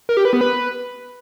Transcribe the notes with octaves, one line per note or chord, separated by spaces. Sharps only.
A#4
G4
B4
B3
B4